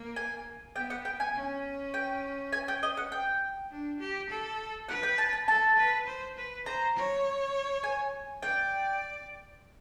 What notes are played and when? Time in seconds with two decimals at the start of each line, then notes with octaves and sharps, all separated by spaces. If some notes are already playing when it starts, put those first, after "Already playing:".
Already playing: A#3
0.16 G#5
0.76 B3 G5
0.90 F#5
1.05 G5
1.20 G#5
1.35 C#4
1.94 G5
2.52 G#5
2.68 G5
2.83 D#5
2.97 F#5
3.12 G5
3.71 D4
4.00 G4
4.29 A4
4.88 B4 F#5
5.03 G5
5.18 A5
5.33 A5
5.48 A4 A5
5.77 B4
6.06 C5
6.37 B4
6.66 C5 A#5
6.96 C#5
7.83 G#5
8.43 D5 G5